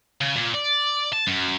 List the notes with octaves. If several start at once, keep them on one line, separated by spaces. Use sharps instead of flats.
C#3
A#2
D5
A5
F#2